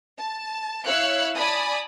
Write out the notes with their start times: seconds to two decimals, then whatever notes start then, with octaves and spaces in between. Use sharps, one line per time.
0.19 A5
0.85 E4 C#5 F5 E6 F#6 C#7
1.36 D5 G#5 A5 B5 D#6